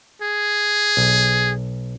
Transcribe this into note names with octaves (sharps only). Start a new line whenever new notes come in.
G#4
B1